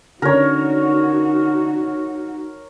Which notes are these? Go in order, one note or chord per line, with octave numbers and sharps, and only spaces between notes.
D3 C#4 D#4 F#4 A#4 C#5